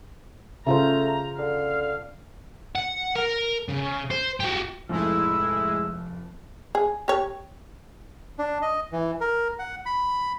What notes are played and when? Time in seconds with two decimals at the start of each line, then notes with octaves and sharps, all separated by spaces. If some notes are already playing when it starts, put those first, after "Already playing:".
0.67 C#3 A3 F4 C5 A#5
1.39 D3 F5
2.75 F#5
3.16 A#4
3.69 C#3
4.11 C5
4.40 F#4 G4
4.89 F1 A2 F3 G#3 E4 E6
6.75 G#4
7.08 G4 C#5
8.39 D4
8.62 D#5
8.92 E3
9.21 A#4
9.59 F#5
9.86 B5